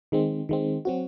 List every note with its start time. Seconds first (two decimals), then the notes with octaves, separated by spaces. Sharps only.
0.12 D#3 G#3 C4
0.49 D#3 G#3 C4
0.85 F#3 C4 F#4